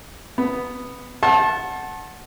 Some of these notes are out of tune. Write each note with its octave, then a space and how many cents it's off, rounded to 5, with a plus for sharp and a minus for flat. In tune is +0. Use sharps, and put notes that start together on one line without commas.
B3 +0 B5 +0
F#5 +0 A5 -10 C6 +45